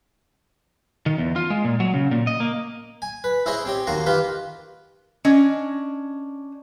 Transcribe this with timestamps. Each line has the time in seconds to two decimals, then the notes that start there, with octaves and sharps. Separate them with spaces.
1.06 D#3
1.18 E2
1.36 F4
1.50 G#3
1.64 A#2
1.80 F#3
1.94 C#3
2.11 A#2
2.27 D#5
2.40 A#3
3.02 G#5
3.24 B4
3.46 E4 G#4 C5 C#5 D#5
3.65 C4 G4 C#5
3.87 D#2 A#3 F#4 A#5 C6
4.06 D#3 F4 G4 B4
5.25 C#4 D4 D#5